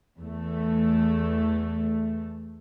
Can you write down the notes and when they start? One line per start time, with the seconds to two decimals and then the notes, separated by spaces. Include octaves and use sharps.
0.19 E2 A3